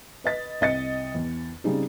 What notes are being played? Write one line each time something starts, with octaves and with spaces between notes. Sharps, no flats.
B4 D#5 A6 B6
C2 D#5 A6 C#7
E2
C#3 G3 C4 D#4 G#4